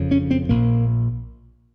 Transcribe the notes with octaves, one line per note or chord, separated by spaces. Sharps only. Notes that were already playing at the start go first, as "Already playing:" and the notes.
Already playing: F#1 F2 C#3
C#4
C4
A#1 A#2 A#3